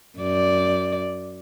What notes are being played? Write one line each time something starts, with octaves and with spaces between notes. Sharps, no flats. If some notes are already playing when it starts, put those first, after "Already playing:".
F#2 D5